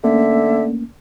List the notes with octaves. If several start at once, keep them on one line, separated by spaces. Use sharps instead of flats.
D3 A3 A#3 C#4 E5